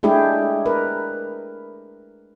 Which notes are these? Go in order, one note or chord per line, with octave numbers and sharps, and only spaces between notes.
G#3 A3 D4 E4 G4 G#4
A#4 B4